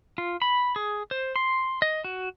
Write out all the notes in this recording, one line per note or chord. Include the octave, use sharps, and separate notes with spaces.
F4
B5
G#4
C5
C6
D#5
F#4